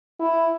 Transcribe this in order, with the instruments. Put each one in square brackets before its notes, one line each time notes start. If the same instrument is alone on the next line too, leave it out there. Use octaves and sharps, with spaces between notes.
[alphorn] E4